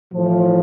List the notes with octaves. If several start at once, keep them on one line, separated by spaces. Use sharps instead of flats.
A2 E3 F3